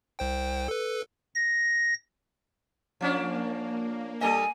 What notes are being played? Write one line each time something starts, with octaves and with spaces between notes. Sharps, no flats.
C2 C5 G5
A4 B4
A#6
F3 A#3 C#4 D4
G3 A4 D#5 G#5